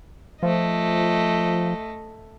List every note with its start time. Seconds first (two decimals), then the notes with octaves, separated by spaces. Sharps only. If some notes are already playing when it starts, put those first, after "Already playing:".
0.43 F3 A3 D#5